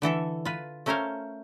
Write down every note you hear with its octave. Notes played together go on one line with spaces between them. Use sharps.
D3 E3 A4 E5
F4 B4
A3 C#4 A#4 C5 C#5 F5